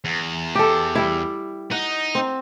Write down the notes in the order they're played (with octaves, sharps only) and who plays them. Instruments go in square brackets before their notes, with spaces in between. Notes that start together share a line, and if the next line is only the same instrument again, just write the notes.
[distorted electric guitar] E2
[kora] G4 A4
G3 E4
[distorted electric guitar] D#4 [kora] F#5
[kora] C4